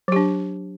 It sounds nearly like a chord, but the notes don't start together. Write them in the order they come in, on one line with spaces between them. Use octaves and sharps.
F#3 G4 D4